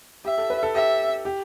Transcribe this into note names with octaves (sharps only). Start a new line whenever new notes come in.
G4 E5
A4
B4
A4
G4 E5
G4